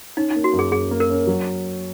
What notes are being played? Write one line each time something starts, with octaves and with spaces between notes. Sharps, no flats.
C#4 D#4
D#4
A#3
F#4
F#2
G#4
F#2 G#4
A#3
A#4
C#4
F#3